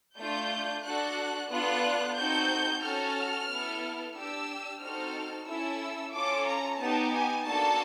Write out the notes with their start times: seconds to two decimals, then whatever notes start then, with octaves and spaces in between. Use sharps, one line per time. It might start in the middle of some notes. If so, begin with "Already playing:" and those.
0.18 A3 D4 F4 G6
0.84 D4 F#4 A4 F#6
1.50 B3 D4 F4 A4 F#6
2.16 C4 D#4 F#4 A4 G6
2.82 C#4 F#4 A4 F6
3.49 B3 E4 A4
4.15 D4 G4 E6
4.81 C4 D#4 F#4 A4 F6
5.47 C#4 E4 A4 E6
6.13 C#4 F4 A4 D6
6.47 A#5
6.79 B3 D#4 G4 A5
7.12 G#5
7.45 A#3 D4 F#4 A4 A5